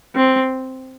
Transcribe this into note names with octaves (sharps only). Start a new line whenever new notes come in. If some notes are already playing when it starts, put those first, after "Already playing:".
C4